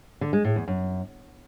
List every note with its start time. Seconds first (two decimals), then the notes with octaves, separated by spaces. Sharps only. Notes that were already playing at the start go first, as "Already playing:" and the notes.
0.21 D3
0.33 G#3
0.44 A2
0.56 E2
0.68 F#2